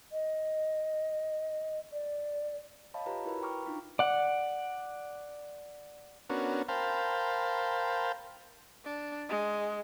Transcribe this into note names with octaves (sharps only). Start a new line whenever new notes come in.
D#5
D5
C#5 D#5 F5 A5 B5
F4 G4 B4 C#5 A#5
E4 F#4 A#4 B4 B5
G5 A#5 C#6 D6 F6
D4 D#4 F4
D5 F#5
B3 C#4 D4 F#4 A#4
A#4 C5 F5 G5 A5 B5
D4
G#3